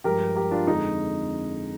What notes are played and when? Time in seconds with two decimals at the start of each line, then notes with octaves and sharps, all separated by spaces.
0.04 G2 F3 G#3 G4 A#4
0.36 G4 A#4
0.51 D4 F4
0.67 F2 D3 G#3 D#4